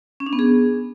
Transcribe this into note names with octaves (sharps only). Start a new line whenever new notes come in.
C#4
D4
B3
G#4